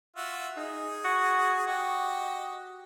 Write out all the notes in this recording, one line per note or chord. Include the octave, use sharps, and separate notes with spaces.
F4 F#4 E5
D#4 G#4
F#4
F#4 G4 D#5